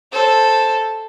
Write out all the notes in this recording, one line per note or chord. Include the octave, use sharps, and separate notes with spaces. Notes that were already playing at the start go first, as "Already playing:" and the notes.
A4 C5